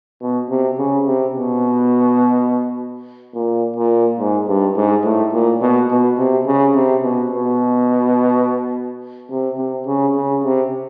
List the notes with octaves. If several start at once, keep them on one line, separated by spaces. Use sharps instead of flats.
B2
C3
C#3
C3
B2
A#2
A#2
G#2
G2
G#2
A2
A#2
B2
B2
C3
C#3
C3
B2
B2
C3
C3
C#3
C#3
C3